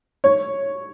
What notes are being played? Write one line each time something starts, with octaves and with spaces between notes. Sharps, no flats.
C#5